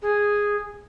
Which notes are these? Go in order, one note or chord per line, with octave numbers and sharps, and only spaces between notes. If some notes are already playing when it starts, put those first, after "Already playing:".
G#4